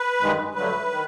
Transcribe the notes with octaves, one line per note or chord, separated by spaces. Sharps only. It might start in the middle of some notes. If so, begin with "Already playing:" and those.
Already playing: B4
G2 D#3 G#3
G2 D3 F#3 A3 B4
D#3